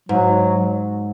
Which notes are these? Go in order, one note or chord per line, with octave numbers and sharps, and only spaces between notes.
G#2 F#3